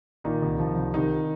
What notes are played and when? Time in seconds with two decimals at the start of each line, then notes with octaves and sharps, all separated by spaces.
0.24 A#2 D#3 D#4
0.42 C2
0.59 F3
0.77 C2
0.94 C3 D#3 D#4